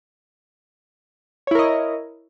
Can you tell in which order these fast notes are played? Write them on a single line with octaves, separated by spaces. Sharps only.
C#5 E4 A#4 D#5